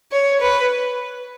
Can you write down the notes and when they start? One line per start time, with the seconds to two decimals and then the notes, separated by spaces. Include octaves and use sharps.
0.12 C#5
0.41 B4